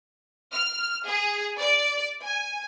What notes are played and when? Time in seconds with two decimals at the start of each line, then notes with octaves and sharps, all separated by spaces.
0.52 F6
1.07 G#4
1.60 D5
2.23 G#5